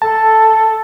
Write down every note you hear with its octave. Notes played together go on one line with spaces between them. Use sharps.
A4 A5